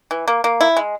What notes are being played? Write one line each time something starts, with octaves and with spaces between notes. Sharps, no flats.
E3
A#3
A#3
E4
G#3